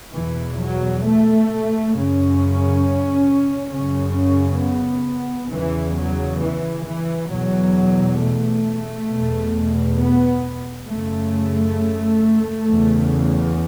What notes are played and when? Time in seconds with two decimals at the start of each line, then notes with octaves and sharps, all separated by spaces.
0.14 E2 B2 E3
0.59 F#3
1.04 A3
1.93 F#2 C#3 C#4
3.73 F#2 C#3 C#4
4.17 C#4
4.63 B3
5.52 E2 C#3 E3
5.97 F#3
6.42 E3
6.87 E3
7.32 E2 B2 F#3
8.21 A3
9.10 E2 B2
10.00 B3
10.90 F#2 C#3 A3
12.69 E2 C#3